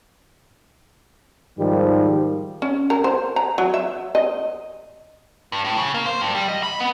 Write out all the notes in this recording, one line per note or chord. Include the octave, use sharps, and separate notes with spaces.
G#2 D#3 F3 G3
C#4
A#4
C5
A#5
F#3
E5
D#5
G2
A2
C#3
A#3
C5
G2
G3
D#5
B5
B3